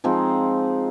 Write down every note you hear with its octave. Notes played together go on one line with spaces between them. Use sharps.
F3 G#3 C4 D#4